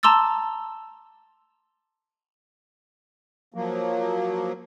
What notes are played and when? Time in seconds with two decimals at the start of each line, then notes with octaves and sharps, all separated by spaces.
0.03 A5 A#5 C6 D6 E6 A6
3.54 F3 F#3 A#3